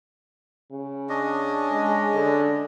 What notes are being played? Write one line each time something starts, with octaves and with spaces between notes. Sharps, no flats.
C#3
C#4 D4 D#5
G#3
D3